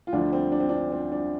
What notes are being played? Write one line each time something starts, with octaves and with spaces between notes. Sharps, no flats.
F4
D2 D3 F3 D4
C4
D4
C4
D4
C4
D4